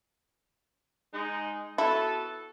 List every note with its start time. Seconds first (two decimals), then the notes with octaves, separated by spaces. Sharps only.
1.14 G#3 D#4
1.78 B3 E4 F#4 A4